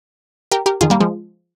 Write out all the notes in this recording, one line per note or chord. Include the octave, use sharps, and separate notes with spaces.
G4 A#4
G4 A#4
F2 D#3 F4 G#4
G3 A#3
F3 G#3